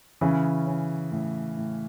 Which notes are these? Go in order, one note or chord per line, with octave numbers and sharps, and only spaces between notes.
C#3 E3 C#4
C#4
A2
A2